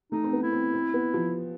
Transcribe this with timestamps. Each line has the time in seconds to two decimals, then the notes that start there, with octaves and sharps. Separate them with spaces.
0.12 A3 D#4
0.24 C4
0.33 B3
0.42 E4
0.53 C4
0.73 C4
0.94 B3
1.14 F3